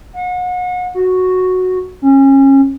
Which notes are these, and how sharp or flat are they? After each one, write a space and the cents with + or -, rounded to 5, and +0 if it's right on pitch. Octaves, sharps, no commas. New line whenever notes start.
F#5 -35
F#4 -5
C#4 -30